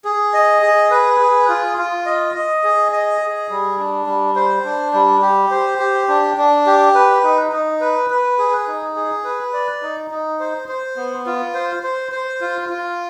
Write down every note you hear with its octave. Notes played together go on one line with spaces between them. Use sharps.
G#4
D#5
G#4
B4
G#4
F4
F4
D#5
D#5
G#4
D#5
G#4
G3
D4
G3
C5
D4
G3
G4
C5
G4
D4
D4
G4
B4
D#4
D#4
B4
B4
G#4
D#4
G#4
B4
D5
D#4
D#4
C5
C5
B3
F4
C5
C5
C5
F4
F4